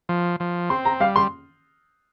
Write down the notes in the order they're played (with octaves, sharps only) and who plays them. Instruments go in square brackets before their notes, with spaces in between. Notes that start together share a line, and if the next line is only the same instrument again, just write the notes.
[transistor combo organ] F3
F3
[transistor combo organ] C4 [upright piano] C6
[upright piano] A#5
[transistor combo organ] G3 [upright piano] F5
[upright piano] C6